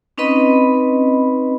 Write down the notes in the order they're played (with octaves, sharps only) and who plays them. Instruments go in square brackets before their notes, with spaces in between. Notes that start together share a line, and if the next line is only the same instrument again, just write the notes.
[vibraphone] C4 C#4 D#4 B4 D#5 B5